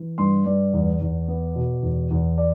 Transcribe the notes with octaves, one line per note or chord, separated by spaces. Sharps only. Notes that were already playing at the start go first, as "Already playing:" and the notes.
Already playing: E3
G2 C6
G2 D5
E2
E2
B3
B2
E2
E2
D5